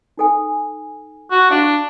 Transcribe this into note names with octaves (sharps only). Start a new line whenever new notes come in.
D#4 A4 G#5
F#4
D4 F#4 D5 F5